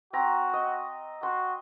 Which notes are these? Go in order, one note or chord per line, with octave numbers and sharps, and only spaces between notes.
C4 F#4 A#5
D#5
F#4 C6